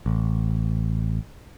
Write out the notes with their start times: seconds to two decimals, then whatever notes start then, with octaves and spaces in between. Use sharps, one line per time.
0.06 A1